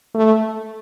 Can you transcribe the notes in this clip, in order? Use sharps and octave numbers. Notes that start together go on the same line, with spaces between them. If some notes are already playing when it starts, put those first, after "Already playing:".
A3